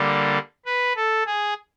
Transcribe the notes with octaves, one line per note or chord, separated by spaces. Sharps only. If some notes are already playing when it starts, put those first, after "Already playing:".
Already playing: D3 G3 A#3
B4
A4
G#4